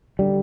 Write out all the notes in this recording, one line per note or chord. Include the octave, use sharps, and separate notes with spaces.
D3 G3